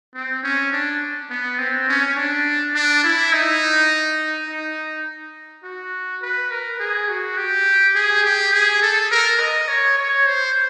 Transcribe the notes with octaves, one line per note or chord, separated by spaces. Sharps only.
C4
C#4
D4
B3
C4
C#4
D4
D4
E4
D#4
D#4
F#4
B4
A#4
G#4
F#4
G4
G#4
G4
G#4
A4
A#4
D#5
C#5
C#5
C5